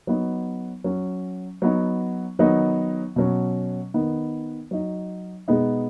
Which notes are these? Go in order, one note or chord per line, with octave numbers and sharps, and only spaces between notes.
F#3 B3 D#4
F#3 C#4
F#3 B3 D#4
D#3 F#3 B3 D#4
B2 F#3 C#4
D#3 B3 D#4
F#3 D#4
B2 G#3 B3 D#4